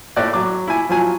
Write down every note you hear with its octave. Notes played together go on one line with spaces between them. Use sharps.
A2 D5 F#6
F#3 D6
E4 G#5
F3 F#3 G#5